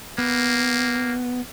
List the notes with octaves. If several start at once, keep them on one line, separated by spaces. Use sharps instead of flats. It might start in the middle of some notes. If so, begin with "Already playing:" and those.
A#3 B3